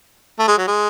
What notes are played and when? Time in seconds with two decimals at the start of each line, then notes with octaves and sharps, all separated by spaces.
0.39 A3
0.48 G#3
0.58 F#3
0.67 G#3